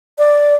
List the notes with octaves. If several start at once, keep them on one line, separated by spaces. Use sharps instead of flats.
D5